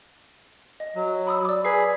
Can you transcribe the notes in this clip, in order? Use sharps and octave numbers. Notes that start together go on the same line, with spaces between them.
D#5
F#3
B5 D#6 E6
D5 D6
G#4 B4 B5 C7